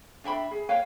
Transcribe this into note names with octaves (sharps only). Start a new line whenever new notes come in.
D4 E5 G5 B5
G#4
B4 C#5 F5 G5